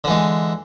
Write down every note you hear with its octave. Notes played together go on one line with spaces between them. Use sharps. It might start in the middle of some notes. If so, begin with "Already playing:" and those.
D3 E3 G#3